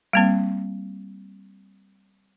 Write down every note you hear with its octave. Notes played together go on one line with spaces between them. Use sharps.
G3 A#3 C4